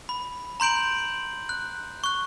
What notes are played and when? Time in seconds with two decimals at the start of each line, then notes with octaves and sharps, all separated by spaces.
0.09 B5
0.60 A#5 C6 G6 D7 F#7
1.49 F#6
2.04 C#6 F#6